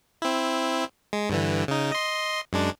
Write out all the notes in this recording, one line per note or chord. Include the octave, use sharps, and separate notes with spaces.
C4 E4
G#3
G2 D3 E3
C#3 D#4
D#5 C6
F#2 G#3 D4